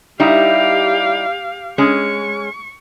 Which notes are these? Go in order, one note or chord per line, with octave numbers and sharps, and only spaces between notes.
G3 D#4 E4 G4 F5
G#3 C#4 C#6